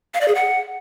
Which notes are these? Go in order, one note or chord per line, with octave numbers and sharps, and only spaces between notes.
F5
D5
G#4
F#5